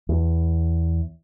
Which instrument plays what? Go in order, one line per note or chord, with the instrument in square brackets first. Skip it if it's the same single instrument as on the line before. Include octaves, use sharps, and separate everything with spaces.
[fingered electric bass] E2